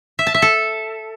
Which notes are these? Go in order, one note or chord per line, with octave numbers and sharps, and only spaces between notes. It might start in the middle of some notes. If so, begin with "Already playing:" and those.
E5
A5
E5
A4